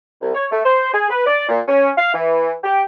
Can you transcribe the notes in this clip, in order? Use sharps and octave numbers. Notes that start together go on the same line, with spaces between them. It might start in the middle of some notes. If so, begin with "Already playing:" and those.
C2
C#5
A3
C5
G#4
B4
D5
A#2
C#4
F5
E3
G4